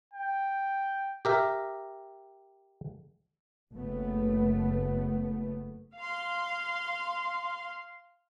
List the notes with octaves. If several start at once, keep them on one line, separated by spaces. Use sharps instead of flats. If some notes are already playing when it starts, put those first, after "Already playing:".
G5
G4 A#4 E5
F#1 A3 B3
F5 C6